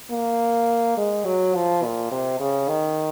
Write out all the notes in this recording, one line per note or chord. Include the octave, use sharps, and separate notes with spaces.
A#3
G#3
F#3
F3
A#2
C3
C#3
D#3